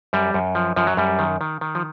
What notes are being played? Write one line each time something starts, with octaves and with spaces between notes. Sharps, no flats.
F#2 G3
F#2
F3
F#2 F3
F#3
F#2 G3
D#3
D#3
D#3
F3